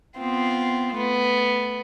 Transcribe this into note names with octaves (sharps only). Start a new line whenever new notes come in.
B3 C4 F4
A3 B3